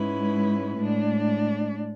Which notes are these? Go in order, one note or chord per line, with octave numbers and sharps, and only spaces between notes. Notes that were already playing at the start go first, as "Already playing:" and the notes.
Already playing: G#2 G#3 C#4 E4 B4
A2 G#3 D4